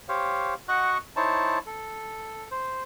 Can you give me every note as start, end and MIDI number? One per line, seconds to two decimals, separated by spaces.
0.09 0.54 67
0.09 0.54 72
0.09 0.54 73
0.09 0.54 77
0.68 0.98 66
0.68 0.98 75
0.68 0.98 78
0.68 0.98 85
0.68 0.98 90
1.16 1.58 63
1.16 1.58 64
1.16 1.58 72
1.16 1.58 73
1.16 1.58 81
1.66 2.48 69
2.51 2.83 72